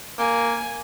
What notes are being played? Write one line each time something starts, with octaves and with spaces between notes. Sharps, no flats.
A#3 G#5